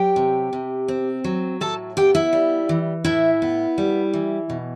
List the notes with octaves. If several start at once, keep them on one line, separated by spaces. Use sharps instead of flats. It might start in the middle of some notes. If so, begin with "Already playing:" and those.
Already playing: F#3 G4 G5
C3
C3
C4
F#3
A2 A4 A5
B3 G4 G5
E4 E5
G3
E3
A2 E4 E5
B3
G3
E3
B2